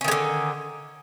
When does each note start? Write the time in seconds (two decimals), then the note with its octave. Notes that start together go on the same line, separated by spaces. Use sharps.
0.01 C#4
0.04 D#3
0.08 G#3
0.11 D3